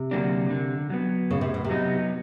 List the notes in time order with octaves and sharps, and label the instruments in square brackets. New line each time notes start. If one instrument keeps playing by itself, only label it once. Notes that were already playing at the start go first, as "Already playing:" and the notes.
Already playing: [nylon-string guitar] C3
[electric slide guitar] D3 F#3 A#3 D4
D3
F#3 B3
[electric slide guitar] A2 [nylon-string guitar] C#3
[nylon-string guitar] C3
B2
C3
[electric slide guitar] F#3 B3 D#4